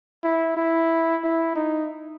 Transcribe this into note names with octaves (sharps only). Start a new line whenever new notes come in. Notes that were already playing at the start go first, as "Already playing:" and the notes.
E4
E4
E4
D#4